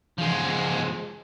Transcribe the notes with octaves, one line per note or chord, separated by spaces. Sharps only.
F3 G#3